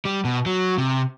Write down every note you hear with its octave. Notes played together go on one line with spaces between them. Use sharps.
G3
B2
F#3
C3